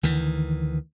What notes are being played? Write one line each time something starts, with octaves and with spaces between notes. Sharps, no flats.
D2 D#3 E3